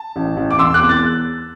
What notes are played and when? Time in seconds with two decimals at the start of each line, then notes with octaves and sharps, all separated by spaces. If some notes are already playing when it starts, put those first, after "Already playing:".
Already playing: A5
0.16 A1
0.37 A1
0.51 D6
0.59 E1 C6 E6
0.74 D6 F#6
0.82 E2
0.89 F#6 A6